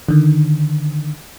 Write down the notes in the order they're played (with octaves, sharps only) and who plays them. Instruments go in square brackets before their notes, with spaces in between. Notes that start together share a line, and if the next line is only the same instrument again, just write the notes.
[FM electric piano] D3 D#3